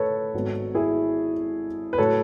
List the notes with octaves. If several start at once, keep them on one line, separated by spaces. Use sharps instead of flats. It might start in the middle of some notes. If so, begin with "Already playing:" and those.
Already playing: A2 A4 B4 C#5
G#1 G#2 F#3 B3
E4 G#4
B4
A2 F#3 A4 C#5